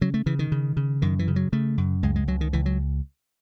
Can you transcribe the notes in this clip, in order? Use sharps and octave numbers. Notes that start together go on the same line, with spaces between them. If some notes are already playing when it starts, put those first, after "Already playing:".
C#3 F#3
A3
C#3 E3
D#3
C#3
C#3
F#2 D#3
E3
C#3
F#3
C#3 A3
F#2
C#2 G#3
G#3
C#2 F#3
D#3
C#2 E3
F#3